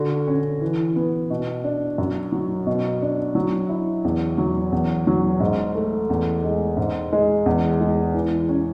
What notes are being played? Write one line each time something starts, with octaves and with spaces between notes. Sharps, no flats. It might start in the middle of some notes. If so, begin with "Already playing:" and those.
Already playing: D3 F#4
C#4
E3
B3
B2
D4
F#2
F#3
B2
D4
F#3
E4
E2
F#3
E2
F#3
G#2
A3
E2
G#3
G#2
G#3
E2
G#3
E3
C#4